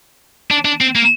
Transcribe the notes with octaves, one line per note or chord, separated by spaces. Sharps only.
D4
D4
C4
A#3